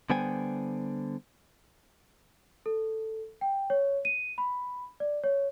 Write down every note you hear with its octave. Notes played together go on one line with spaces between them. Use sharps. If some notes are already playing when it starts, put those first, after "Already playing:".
D3 G3 B3 C5 G5 G#5
A4
G5
C#5
D#7
B5
D5
C#5